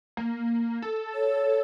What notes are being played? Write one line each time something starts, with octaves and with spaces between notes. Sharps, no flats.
A#3
A4
C#5